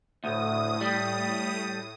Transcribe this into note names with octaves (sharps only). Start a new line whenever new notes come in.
D2 A2 D#6
G3